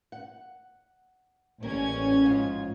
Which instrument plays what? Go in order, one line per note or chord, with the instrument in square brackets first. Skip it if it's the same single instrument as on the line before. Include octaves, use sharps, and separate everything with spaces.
[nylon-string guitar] F#5
[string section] A1 C#4 G#6 [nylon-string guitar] G3 A#3
[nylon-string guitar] F2 G#2 F4